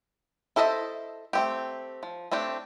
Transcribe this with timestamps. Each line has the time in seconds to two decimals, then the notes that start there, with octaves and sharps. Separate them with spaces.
0.56 E4 A4 C5 D#5 E5
1.33 A3 C4 G4
2.03 F3
2.32 A3 C4 D4 G4